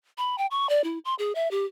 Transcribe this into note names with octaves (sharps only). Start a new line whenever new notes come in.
B5
G5
C#6
D5
E4
C6
G#4
E5
G4